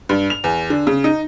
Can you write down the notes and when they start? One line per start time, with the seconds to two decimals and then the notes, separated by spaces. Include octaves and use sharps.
0.09 G2
0.30 F7
0.44 E2
0.70 D3
0.87 C#3
1.04 D#4